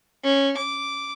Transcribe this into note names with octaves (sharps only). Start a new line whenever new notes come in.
C#4
D6